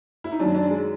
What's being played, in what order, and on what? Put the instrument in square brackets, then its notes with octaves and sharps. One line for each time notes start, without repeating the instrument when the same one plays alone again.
[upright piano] E4
D#4
F#2 D#3 D4
D4
G#3